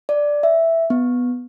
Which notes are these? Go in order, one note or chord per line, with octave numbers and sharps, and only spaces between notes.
D5
E5
B3